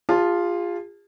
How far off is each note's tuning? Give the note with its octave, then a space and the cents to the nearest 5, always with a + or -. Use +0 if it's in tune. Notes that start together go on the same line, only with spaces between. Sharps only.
F4 +0 G#4 -40 A5 +0